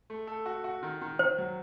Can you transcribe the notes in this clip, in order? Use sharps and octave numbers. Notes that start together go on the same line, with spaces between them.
A3
A4
F#4
F#4
D#3
D#3
D#3 C5
F#3